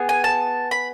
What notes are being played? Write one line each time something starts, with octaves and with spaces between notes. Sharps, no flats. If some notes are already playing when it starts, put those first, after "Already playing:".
Already playing: B3 G#4
G#5
A5
B5